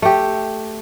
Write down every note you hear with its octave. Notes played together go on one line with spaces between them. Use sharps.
A3 G4